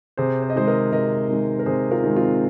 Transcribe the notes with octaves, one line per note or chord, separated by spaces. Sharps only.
C3 G#4 C5
C5
D#5
D#3 G#3 G#4 C5
A#4 D#5
C3 A#4 D#5
D#3 G#3
A#4
C3 G#4 C5
F4 A#4
D#3 G#3
C4 F4